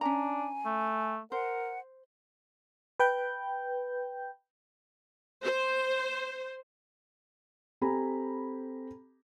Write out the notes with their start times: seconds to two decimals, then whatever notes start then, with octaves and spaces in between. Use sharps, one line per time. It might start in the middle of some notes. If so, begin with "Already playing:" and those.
0.01 C#4 D4 G#5 A#5
0.66 A3
1.32 A#4 C5 F#5
3.00 B4 G5 G6
5.43 C5
7.81 C4 G4 A4 G#5 A#5 B5